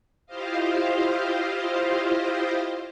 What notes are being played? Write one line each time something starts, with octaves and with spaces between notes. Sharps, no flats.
E4 F4 G4 C5 D#5 F5